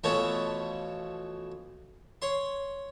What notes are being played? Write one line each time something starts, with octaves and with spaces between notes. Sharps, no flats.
B2 E3 F3 A3 C#5 A5
C#5 C6